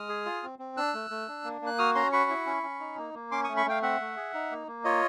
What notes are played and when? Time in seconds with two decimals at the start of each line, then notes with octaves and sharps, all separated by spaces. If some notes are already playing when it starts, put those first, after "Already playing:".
Already playing: G#3 D#6 F6
0.09 G#4
0.25 F4
0.43 C4
0.59 C4
0.77 D4 E6 F#6
0.94 A3
1.10 A3
1.28 D4
1.44 A#3
1.61 A#3
1.66 F#6
1.79 F#4 D#6 F6
1.95 C#4 A#5 C6
2.12 F#4 B5 C#6
2.30 E4
2.46 C#4
2.63 C#4
2.80 D#4
2.98 A#3
3.14 A#3
3.31 C#4 C6 D6
3.44 C#6 D#6
3.49 A3
3.57 B5 C#6
3.66 A3 F5 G5
3.82 C4 E5 F#5
4.00 A3
4.16 G#4
4.34 D#4
4.51 A#3
4.67 A#3
4.84 F4 C#5 D#5